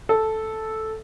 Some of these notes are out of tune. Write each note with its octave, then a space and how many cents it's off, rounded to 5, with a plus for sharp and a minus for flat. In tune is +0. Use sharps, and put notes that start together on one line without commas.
A4 -5